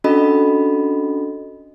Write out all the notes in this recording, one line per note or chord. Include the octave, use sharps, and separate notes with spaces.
C#4 D4 F#4 A4 D#5 B5